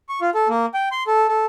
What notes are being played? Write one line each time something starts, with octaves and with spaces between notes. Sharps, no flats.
C#6
F4
A4
A#3
G5
C6
A4
A4